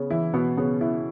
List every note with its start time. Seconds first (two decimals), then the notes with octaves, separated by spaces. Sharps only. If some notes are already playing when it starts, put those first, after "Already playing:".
Already playing: C#3 B3 C#4
0.10 E3 E4
0.34 B2 B3
0.57 C#3 B3
0.81 E4